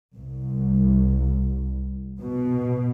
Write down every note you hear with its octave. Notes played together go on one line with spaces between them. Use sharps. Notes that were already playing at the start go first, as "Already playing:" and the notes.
C2
B2